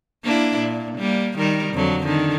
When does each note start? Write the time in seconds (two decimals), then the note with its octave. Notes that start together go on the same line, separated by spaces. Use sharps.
0.24 A#3 D4 E4
0.58 A#2
0.98 G3 A#3
1.38 D#3 G3 A#4
1.74 F2 D3 F#3
2.04 D3 D#3